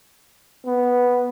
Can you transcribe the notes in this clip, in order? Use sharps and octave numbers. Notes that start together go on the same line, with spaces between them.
B3